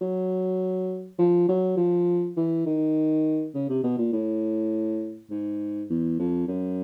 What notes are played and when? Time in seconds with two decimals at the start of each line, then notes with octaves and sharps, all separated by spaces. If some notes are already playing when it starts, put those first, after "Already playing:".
0.01 F#3
1.19 F3
1.48 F#3
1.77 F3
2.36 E3
2.66 D#3
3.54 C#3
3.69 C3
3.83 B2
3.98 A#2
4.12 A2
5.30 G#2
5.90 E2
6.19 F2
6.47 F#2